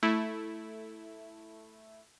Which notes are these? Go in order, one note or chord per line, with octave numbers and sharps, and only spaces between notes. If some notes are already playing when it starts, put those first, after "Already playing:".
A3 E4